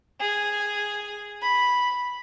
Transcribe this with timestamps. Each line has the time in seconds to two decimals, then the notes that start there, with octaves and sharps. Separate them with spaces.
0.21 G#4
1.42 B5